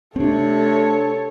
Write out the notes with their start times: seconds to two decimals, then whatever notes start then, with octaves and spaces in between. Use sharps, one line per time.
0.16 C3 A3 C4 D4 A4 C#5